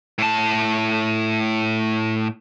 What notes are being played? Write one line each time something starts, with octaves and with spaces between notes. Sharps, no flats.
A2 A5